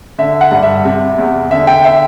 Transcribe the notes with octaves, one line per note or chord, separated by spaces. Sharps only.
D3 E5
F#5
G2
E5
C3
E2
D3 E5
G5
E5